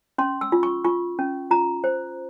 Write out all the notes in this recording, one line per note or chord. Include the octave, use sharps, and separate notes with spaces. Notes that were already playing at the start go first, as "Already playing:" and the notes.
C#4 C6
E6
F4
C#6
F4 C#6
C#4
F4 A#5
C5